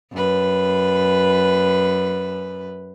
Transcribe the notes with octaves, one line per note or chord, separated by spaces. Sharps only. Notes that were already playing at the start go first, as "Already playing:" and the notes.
F#2 B4